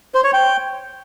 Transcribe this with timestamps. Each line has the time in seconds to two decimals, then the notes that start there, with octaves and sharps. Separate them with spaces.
0.14 C5
0.24 C#5
0.33 G5